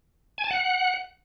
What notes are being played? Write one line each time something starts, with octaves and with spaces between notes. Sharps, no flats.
G#5
A5
F#5